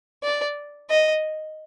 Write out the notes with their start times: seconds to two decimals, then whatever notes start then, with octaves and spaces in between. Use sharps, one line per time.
0.23 D5
0.90 D#5